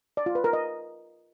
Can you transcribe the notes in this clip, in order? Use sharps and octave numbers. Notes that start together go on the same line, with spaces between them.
D5
F4
B4
A#4
D#5